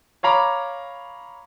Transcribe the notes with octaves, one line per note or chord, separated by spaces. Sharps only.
C#5 F5 A#5 B5 D6